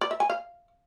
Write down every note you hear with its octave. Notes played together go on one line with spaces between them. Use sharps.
D5
E5
G#5
F5